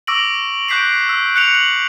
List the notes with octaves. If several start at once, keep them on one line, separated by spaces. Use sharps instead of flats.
C#6 D6 E6 A#6 D7 F#7
C#6 F#6 G6 B6 C7 D7
E6
F#6 C#7 F7
F#7